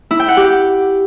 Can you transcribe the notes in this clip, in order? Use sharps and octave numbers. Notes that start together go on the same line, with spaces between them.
E4
G5
F#5
G4